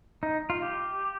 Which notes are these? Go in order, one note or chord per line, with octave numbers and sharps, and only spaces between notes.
D#4
F4
G4